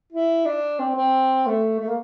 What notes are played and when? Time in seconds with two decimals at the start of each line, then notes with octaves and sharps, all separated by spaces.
0.13 E4
0.45 D4
0.80 C4
0.96 C4
1.46 A3
1.80 A3
1.88 A#3